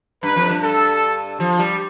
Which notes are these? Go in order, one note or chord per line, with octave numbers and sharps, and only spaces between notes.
G2 B4
F2
G2
A4
F3
G3